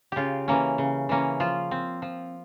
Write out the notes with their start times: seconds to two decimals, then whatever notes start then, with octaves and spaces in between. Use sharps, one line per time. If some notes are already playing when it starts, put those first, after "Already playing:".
0.12 C#3 F4 G4
0.48 E3 A#3 C#4
0.78 C#3
1.09 E3 A#3 C#4
1.40 F3 F4
1.71 C4
2.02 F3